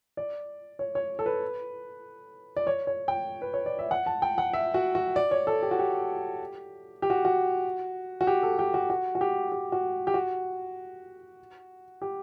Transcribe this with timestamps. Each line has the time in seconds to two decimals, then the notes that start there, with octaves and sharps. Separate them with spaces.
0.17 D5
0.79 C#5
0.95 C#5
1.19 A4
1.26 B4
2.57 D5
2.67 C#5
2.87 C#5
3.08 G5
3.42 B4
3.54 C#5
3.66 D5
3.79 E5
3.91 F#5
4.06 A5
4.22 G5
4.38 F#5
4.53 E5
4.74 F#4
4.95 F#4
5.16 D5
5.31 C#5
5.47 A4
5.63 G4
5.71 F#4
5.79 G4
7.02 G4
7.10 F#4
7.25 F#4
8.21 F#4
8.27 G4
8.43 A4
8.59 G4
8.74 F#4
8.90 F#4
9.15 F#4
9.21 G4
9.52 G4
9.72 F#4
10.07 G4
10.14 F#4
12.02 G4